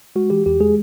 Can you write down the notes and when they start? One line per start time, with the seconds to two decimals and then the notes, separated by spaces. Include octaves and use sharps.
0.16 G#3 F#4
0.30 E3 G4
0.46 E2 G4
0.61 G#3 G#4